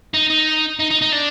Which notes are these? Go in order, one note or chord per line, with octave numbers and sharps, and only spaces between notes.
D#4
D#4
D#4
D#4
D#4
D4